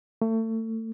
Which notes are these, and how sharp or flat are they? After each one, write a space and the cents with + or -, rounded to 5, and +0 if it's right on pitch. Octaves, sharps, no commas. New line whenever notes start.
A3 +30